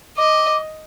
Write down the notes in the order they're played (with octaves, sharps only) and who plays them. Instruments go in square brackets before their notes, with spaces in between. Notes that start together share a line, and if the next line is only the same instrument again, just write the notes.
[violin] D#5 [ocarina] D6